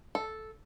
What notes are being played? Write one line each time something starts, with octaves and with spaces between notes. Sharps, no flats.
A4